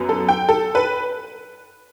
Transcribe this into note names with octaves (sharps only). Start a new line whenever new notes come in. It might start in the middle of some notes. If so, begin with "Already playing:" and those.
Already playing: F#2 F#3 B3
A4
G5
A4
B4